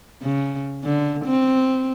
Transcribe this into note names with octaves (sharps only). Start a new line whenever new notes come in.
C#3
D3
C4